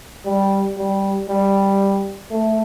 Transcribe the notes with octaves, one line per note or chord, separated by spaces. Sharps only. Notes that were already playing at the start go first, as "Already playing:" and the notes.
G3
G3
G3
A3